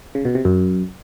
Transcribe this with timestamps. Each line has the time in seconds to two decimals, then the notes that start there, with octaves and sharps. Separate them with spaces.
0.15 C#3
0.25 B2
0.35 C3
0.45 F#2